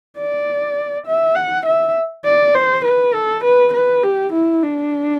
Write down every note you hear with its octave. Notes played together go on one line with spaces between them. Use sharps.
D5
E5
F#5
E5
D5
C5
B4
A4
B4
B4
G4
E4
D4